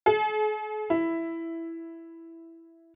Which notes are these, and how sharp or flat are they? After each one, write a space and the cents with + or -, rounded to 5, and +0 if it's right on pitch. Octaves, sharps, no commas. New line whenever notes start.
G#4 +45
E4 +5